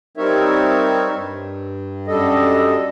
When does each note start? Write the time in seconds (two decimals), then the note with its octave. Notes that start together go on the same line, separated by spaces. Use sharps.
0.17 G3 C4 D#4 A#4 C#5 E5
1.15 G2
2.07 F#2 G3 D4 A4 D#5